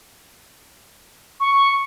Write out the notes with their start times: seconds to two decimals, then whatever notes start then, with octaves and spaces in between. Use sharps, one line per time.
1.40 C#6